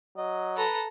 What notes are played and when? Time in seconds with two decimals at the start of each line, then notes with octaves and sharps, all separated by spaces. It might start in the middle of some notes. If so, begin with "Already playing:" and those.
0.17 F#3 D#5
0.57 A4 B4 A#5